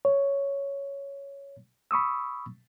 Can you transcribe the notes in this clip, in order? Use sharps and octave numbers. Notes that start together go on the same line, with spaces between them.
C#5
B5 C#6 D#6 E6